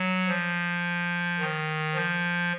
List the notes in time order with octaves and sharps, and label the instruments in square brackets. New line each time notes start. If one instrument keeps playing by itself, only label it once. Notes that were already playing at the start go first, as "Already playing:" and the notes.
Already playing: [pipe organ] F#3
F3
D#3
F3